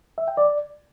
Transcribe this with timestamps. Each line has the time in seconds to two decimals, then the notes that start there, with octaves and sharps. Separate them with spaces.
0.18 E5
0.28 G5
0.37 D5